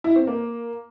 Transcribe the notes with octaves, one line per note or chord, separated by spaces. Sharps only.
E4
C4
A#3